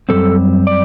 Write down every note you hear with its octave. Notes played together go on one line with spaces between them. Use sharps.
F#2 D3 G3 C4 A4
D5